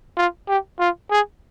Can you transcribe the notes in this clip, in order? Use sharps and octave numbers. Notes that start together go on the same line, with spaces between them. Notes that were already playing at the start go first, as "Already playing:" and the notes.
F4
G4
F4
G#4